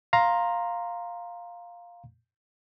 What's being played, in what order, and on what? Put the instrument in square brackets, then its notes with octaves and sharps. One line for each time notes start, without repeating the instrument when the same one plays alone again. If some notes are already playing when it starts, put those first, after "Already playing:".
[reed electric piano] F5 A#5 C6